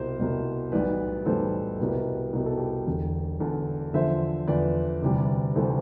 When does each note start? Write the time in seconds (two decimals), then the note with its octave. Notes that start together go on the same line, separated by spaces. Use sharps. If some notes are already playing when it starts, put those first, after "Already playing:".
Already playing: C2 B2 G3 C5
0.19 C2 B2 G3
0.72 B1 A2 E3 G3 B4 D5
1.26 B1 A2 E3 G3 A4 C5
1.79 C2 B2 G3 G4 B4
2.33 C2 B2 G3 G4
2.46 A4
2.58 G4
2.87 E1 E2 D3
3.40 E1 E2 D3 A4
3.94 E2 D3 F3 C5 E5
4.48 E2 D3 F3 B4 D5
5.02 D2 C3 E3 G3
5.55 D2 C3 E3 G3 A4 C5